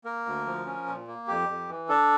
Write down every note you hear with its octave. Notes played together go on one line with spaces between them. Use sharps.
A#3 A#4
D2
F3
C#4
A#2
A#3
F2 G4
F2
E3
D4 A4